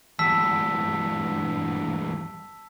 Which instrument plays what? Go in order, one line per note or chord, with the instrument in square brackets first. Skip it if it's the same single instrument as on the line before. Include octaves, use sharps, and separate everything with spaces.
[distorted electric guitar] E2 G2 [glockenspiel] A5 E6 B6